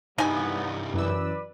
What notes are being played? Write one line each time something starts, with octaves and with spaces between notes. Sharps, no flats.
C2 G2 F#3 G3 B3 D#4 G#5
F#2 E3 B4 D5 E6